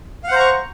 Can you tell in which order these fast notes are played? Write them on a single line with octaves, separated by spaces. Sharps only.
F5 F#5 C5 A#5 C#6